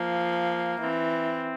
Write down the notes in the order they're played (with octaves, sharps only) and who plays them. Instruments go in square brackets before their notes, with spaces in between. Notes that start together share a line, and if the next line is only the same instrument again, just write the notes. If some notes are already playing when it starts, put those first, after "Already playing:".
Already playing: [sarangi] F3 [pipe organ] A#3
[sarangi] E3 [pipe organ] C4